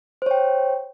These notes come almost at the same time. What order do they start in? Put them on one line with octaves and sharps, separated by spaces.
C5 C#5 G5